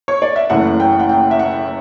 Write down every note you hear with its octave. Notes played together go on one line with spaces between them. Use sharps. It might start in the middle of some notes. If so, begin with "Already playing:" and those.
C#5
D5
E5
F#1 F#2 E3 A3 F#5
G5
F#5
G5
E5
F#5